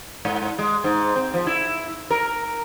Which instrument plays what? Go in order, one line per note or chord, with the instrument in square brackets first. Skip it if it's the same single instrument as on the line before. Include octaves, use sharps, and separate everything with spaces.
[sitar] G#2
G#3
G#2
C4
F3
E4
A#4